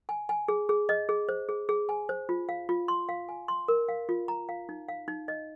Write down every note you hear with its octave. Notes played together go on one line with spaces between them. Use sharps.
G#5
G#5
G#4
G#4
D#5
G#4
C5
G#4
G#4
G#5
C5
F4
F5
F4
C6
F5
G#5
C6
A#4
F5
F4
A#5
F5
D#4
F5
D#4
D#5